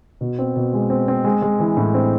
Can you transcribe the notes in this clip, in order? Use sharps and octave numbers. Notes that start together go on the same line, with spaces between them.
B2
C4
B2
G#3
C4
C4
G#3
G#3
E3
A2
C4